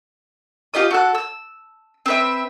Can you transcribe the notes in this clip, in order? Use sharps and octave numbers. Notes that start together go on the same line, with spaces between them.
F4 G4 D#5 D#6
F#4 A4 F#6
E6
C4 B4 E5